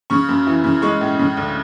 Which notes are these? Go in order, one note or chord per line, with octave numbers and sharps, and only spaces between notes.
C#3 C#6
F#2
E3
C#3
G#3 C#6
A2
C#3
D2